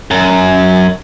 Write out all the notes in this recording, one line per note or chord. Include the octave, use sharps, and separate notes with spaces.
F#2